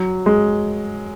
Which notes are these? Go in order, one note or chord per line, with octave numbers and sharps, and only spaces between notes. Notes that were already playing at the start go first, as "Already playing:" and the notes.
Already playing: F#3
G#3